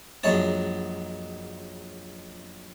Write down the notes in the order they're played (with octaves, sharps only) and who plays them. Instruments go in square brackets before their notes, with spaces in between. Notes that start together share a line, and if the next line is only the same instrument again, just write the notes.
[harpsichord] A#1 F#2 G#3 C#5 A5